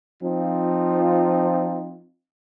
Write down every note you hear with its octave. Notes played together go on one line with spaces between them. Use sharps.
F3 C4 D#4 F4